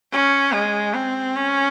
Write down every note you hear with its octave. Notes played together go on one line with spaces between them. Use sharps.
C#4
G#3
C4
C#4